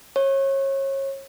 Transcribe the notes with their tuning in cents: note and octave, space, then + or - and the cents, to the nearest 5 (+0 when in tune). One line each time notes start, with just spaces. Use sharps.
C#5 -30